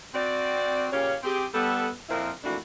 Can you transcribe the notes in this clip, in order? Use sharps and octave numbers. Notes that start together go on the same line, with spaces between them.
C4 F#4 D5
A#2 C#3 C#4 G4 C#5 F5
C4 G4 G#4
G3 B3 A4
F2 A#2 F3 C4 E4 A#4
F2 E3 A3 A#3 D4 F#4